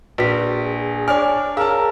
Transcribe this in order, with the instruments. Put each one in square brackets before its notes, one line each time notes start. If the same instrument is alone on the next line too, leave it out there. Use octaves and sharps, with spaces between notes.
[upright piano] A#1 [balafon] F#4 [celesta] B4 B6
[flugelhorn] G#4
[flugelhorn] D4 [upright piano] C#5 D5 F6 [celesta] G#5
[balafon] G#4 C#5 [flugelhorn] A#4 [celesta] F5 [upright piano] A5 E6